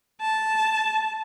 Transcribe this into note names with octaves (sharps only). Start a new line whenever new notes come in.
A5